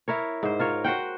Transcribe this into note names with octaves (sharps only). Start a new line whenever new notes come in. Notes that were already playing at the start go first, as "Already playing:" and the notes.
E4 A#4 C#5
G#2 C5
F4 A#4 C#5
F#4 C5 F#5 G5